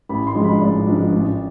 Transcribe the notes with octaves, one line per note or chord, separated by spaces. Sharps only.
A1 B5
C6
G#2 F3 G#3 D4
B5
A1 D5
G#2 F3 G#3 D4
A1